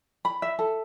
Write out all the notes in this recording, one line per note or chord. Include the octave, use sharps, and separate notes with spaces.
B5
E5
A4